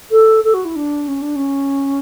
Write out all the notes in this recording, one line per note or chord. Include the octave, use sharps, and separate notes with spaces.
A4
A4
F#4
E4
D4
C#4
D4
C#4